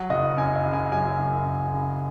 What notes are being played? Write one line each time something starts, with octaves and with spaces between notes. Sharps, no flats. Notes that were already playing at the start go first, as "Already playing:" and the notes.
Already playing: F#3 F#5
F#1 D#5
F#2 G#5
D#5
C#3
G#5
F#3 G#5
F#1
F#2
C#3